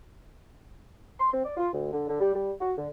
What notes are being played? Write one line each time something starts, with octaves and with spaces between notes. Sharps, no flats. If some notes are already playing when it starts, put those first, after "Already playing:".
C6
C4
D5
F4
D2
D3
D3
G3
G3
F#4
D3